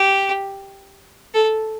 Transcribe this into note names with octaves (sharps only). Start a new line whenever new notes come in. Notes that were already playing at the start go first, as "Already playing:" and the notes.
Already playing: G4
A4